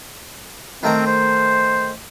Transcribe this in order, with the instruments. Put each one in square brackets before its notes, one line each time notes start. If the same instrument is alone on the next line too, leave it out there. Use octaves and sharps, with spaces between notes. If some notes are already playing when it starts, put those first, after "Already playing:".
[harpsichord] D#3 A3 A#4 [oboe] C4
[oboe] C5